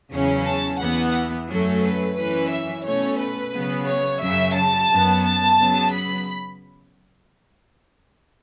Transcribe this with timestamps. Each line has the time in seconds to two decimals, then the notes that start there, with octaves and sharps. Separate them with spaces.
0.11 E2 C#3 F#3 C#4
0.45 A5
0.79 E2 E3 B3 F#5
1.48 F#2 F#3 A3 C#4
1.82 B4
2.16 F#2 E3 C#4 B4
2.50 E5
2.84 B2 A3 C#4 C#5
3.18 B4
3.53 C#3 F#3 B3
3.86 C#5
4.21 F#2 C#3 F#3 E5
4.55 A5
4.89 F#2 F#3 B3
5.23 A5
5.57 C#3 F#3 B3
5.92 B5